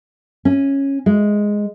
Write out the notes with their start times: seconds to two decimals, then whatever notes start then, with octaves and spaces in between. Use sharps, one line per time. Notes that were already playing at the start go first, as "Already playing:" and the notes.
0.45 C#4
1.06 G#3